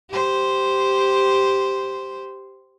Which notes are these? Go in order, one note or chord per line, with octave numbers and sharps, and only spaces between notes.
G4 C5